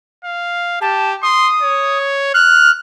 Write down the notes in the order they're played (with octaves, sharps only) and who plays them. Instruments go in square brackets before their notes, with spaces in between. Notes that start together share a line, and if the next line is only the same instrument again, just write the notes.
[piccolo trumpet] F5
[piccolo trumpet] G4 [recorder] A5
[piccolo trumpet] C6 [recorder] D#6
[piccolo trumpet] C#5
[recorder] F6 [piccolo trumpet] F#6